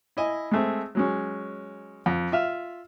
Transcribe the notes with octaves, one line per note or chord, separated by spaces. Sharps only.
E4 D#5 G#5
G#3 A3 C4
F#3 G#3 C#4
F2
F4 E5 F6